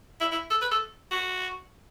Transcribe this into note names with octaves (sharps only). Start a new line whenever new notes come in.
E4
E4
A4
B4
A4
F#4